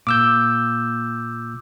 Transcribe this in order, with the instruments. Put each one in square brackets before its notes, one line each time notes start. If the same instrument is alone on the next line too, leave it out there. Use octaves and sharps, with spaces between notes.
[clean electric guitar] A#2 [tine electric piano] D6 E6 G6